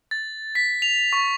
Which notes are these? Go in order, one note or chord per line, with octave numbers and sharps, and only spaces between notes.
A6
B6
F7
C#6